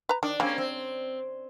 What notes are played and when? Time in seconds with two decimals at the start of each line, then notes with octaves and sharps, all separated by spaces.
0.09 B4 A#5
0.23 D#3 D4
0.40 C#3 G3 A#3 C4 C#4
0.58 C4